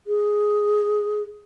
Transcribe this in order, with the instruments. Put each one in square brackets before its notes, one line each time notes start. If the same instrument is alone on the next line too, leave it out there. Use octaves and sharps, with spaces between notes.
[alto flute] G#4